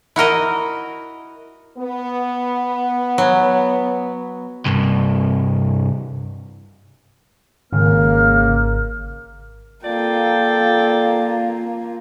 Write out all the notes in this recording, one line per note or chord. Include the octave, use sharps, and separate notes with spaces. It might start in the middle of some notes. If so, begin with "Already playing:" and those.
E4 F#4 A#4 D#5
B3
F#3
C2 G2
G#1 C#3 A#3 F6
A#3 F4 A4 D5 G5